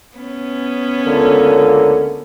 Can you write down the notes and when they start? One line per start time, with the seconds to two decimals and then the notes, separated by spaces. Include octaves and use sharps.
0.17 B3 C#4
1.04 C#2 D3 A#3